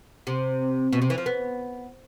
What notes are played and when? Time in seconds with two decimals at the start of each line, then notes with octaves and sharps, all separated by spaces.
0.27 C3
0.93 B2
1.02 C3
1.10 E3
1.18 F3
1.26 B3